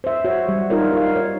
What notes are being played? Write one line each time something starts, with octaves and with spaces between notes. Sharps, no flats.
C5 E5
F#4 C#5
G3
D#4 F4 A#4 C#5
D#4 F5
C#5